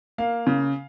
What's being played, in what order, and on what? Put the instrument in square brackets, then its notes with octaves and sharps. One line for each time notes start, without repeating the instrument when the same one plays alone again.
[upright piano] A#3 F5
C#3